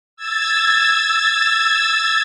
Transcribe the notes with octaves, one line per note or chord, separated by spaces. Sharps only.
E6 G#6 A6